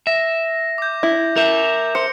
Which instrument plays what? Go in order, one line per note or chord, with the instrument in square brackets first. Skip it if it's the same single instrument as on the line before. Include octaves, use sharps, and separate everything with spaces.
[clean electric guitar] E5 [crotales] A#6
[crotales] D6 G6
[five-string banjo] E4
[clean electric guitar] A#4 E5 [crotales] G6
[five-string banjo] C5 [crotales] C#7